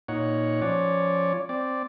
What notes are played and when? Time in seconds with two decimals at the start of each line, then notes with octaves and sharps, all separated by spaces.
0.08 A#2 D#4 C#5 F#5
0.62 F3 C#4 C#5 D5
1.49 C4 D5